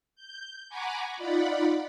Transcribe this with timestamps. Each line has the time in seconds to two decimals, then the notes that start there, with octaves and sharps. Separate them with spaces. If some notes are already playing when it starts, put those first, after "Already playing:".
0.15 G6
0.69 F#5 G#5 A#5 B5 C#6 D6
1.17 D#4 F4 D5 F#5 B5